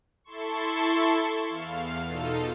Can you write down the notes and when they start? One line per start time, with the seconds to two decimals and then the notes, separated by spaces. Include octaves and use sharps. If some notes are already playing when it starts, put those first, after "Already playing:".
0.24 E4 A4 A5 C6 C#6
1.49 E2 F5
2.07 B2 D#4 F4 A4